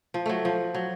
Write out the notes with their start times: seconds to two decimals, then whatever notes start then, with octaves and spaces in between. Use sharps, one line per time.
0.14 F3
0.26 F#3 A3
0.45 F3
0.74 F#3